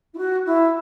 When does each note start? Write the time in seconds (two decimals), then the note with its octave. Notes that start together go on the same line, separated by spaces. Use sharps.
0.13 E4
0.17 F#4
0.45 E4